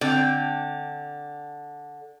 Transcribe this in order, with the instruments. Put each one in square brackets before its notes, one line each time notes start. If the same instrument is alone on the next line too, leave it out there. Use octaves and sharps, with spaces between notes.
[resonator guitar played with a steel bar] D3 [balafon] C4 [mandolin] G5